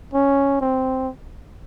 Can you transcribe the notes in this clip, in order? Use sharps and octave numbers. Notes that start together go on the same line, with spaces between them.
C#4
C4